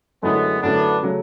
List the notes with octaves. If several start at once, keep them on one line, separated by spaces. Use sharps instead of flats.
F#2 D3 F#3 G#3 A3 B3 E4
F#2 D3 F#3 A3 B3 D4 E4
C#3 F#3 A3